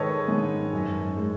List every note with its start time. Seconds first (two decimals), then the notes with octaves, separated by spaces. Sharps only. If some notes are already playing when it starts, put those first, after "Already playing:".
Already playing: G#2 D#3 G#3 A4 B4 C#5 D#5
0.28 G#2
0.73 F#2
1.17 G#3